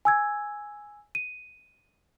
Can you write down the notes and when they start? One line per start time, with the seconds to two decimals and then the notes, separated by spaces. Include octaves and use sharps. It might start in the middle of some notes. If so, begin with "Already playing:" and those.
0.05 G#5 E6 G#6
1.15 D#7